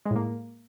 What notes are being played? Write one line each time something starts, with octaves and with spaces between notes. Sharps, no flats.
G#3
A2
A#3